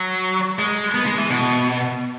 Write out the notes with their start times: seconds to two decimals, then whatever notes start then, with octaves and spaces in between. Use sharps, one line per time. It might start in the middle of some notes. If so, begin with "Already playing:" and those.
Already playing: F#3
0.59 G#3
0.95 B3
1.06 G#3
1.18 E3
1.30 B2